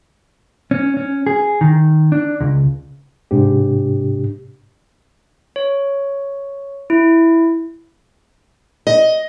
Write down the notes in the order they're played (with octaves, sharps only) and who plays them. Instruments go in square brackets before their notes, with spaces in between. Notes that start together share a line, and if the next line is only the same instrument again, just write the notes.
[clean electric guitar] C#4
C#4
G#4
D#3
D4
C#2
[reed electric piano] G#2 C3 D4 G4
[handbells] C#5
E4
[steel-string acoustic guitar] D#5